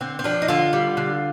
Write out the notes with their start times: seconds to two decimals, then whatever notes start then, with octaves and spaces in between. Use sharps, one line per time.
0.01 D3 C4
0.19 C4
0.24 F3 D4
0.42 D#4
0.48 D3 F4
0.73 G3
0.97 D3